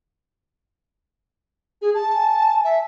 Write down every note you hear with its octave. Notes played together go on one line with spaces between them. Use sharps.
G#4
A5
G#5
E5